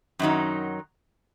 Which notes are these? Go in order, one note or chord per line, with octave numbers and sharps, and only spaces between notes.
F#2 D#3 F#3 D#4